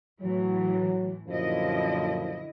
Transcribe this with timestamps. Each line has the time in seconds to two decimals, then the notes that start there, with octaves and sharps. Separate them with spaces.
0.21 A2 E3 F#3
1.27 F#2 A#2 D3 F3 E4 D#5